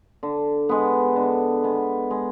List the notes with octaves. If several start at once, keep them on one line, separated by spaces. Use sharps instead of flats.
D3
G#3 B3
D3
G#3 B3
G#3